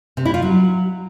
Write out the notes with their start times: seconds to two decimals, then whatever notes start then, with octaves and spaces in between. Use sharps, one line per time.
0.17 C3
0.25 E4
0.34 F4
0.42 F#3